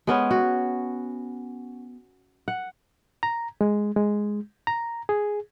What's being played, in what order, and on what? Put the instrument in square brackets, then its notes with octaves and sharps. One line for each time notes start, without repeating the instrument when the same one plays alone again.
[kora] G#3 B3 C#4
F#4
F#5
[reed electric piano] A#5
G#3
G#3
A#5
G#4